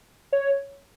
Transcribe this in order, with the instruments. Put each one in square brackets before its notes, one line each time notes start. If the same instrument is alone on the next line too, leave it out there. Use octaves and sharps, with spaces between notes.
[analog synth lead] C#5